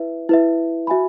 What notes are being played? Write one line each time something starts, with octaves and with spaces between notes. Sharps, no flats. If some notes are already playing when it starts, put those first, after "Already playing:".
Already playing: E4 B4 E5
E4 B4 E5
F#4 E5 G#5 B5